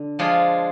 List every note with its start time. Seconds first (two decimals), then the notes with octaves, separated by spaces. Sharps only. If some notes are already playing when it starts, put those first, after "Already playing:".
Already playing: D3
0.19 F3 G#3 D4 F4 G#4